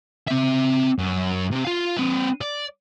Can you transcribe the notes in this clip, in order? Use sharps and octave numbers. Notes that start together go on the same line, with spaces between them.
C4 E5
F#2
C3 C4
F4 F5
C4 B4
D5